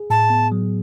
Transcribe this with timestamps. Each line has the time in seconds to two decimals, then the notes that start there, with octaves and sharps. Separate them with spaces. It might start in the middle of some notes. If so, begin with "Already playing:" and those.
Already playing: G#4
0.10 A2 A5
0.30 B3
0.52 F#3